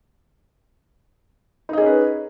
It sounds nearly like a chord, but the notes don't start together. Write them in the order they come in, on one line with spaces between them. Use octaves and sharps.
D#4 D#5 G#4 C#4 B4